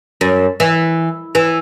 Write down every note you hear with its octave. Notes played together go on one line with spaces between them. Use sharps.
F#2
E3
E3